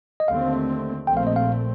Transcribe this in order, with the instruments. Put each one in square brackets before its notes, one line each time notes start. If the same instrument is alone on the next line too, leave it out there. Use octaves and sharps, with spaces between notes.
[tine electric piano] D#5
[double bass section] D#2 D3 A3 C4 [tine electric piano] F5
[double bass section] A#1 A#2 A3 C4 [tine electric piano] G5
[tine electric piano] F5
D#5
F5